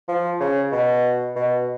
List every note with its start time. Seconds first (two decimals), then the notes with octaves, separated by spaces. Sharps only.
0.08 F3
0.40 C#3
0.72 B2
1.36 B2